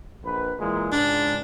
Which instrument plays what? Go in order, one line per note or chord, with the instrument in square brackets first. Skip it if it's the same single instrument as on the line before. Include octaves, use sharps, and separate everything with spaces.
[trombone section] A#1 B4
A#2 E3 G#3
[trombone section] C#2 G#2 [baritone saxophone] D4